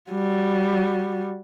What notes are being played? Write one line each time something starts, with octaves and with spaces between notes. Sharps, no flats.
G3 F#4